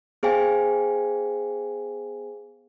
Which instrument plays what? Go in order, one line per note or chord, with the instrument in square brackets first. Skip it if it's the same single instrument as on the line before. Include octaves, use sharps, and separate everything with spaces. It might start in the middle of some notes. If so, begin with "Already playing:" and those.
[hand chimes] B3 G#4 C5 F5 G5 G#5